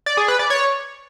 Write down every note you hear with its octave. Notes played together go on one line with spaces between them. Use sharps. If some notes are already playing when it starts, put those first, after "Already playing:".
D5
G#4
B4
D5
C#5